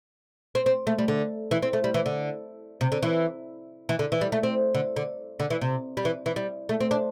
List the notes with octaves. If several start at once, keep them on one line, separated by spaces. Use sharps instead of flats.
C4
C4
A3
G3
D3
E3
C4
A3
G3
E3
D3
C3
D3
E3
E3
D3
E3
G3
A3
C4
D3
D3
D3
E3
C3
G3
E3
E3
G3
A3
C4
D4